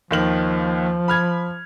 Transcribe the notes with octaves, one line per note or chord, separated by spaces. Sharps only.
D#2 D#3 F3 F#7
B5 F6 G#6